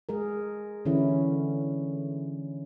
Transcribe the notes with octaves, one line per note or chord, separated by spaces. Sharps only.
G#3 G#4 A#4
D3 E3 C#4 E4